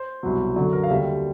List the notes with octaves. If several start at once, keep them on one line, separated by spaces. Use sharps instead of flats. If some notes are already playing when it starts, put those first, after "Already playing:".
Already playing: C5
C2 B2 F#3
F#2 D3 F#3
A#4
F5
D#2 D3 G3 E5